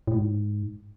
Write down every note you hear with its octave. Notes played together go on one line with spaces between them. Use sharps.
A2
G#2